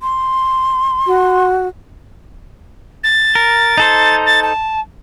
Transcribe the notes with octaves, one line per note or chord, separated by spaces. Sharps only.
C6
F#4
A6
A#4
D#4 A4 C5
A6
A5